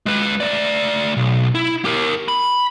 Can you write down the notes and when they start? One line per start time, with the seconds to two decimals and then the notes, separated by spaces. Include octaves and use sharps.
0.06 G#3 B4
0.40 A3 D5
1.17 B1
1.55 E4
1.85 G4 A#4
2.28 B5